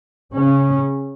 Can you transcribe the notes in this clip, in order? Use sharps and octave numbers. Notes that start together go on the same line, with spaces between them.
C#3 C#4